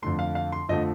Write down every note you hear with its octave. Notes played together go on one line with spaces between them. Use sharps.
F2 D3 A3 C6
F5
F5
C6
F2 D3 F3 A3 D#5